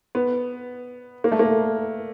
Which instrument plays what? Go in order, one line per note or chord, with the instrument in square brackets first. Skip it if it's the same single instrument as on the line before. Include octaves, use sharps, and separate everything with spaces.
[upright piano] B3
A#3
A3
A#3